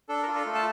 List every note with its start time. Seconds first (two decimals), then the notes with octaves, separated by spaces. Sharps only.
0.09 D4 A4
0.22 A#4
0.28 F4
0.35 A4
0.46 A3
0.55 A5